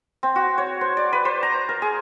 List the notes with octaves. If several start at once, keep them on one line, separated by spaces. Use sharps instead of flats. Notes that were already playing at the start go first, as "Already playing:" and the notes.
C4
F#4
C#5
C5
D5
B4
C5
A#5
A#4
G#4